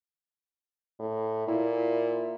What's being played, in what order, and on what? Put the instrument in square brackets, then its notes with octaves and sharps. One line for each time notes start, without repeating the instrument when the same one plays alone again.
[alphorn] A2
[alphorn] A#2 [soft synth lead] E4